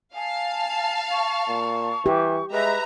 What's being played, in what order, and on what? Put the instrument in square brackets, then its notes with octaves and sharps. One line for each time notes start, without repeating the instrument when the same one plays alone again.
[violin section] F5 A5 [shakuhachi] G#5
[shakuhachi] C#6
[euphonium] A#2
[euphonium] E3 [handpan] G4
[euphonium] G#3 [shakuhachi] B4 [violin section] E5 A#5